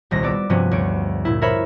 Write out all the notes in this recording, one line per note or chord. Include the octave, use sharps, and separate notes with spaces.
D#1 C2 A#6
B3 D5 D6 E6
G2 C3 F3 B3 C#4 F#4
D2 C#5 D7
A#2 E4
A#4 C5 C#5 E5 B5